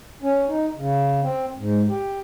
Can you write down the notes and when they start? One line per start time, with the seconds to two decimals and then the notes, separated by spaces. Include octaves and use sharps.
0.23 C#4
0.48 D#4
0.76 C#3
1.22 C4
1.58 G#2
1.89 G4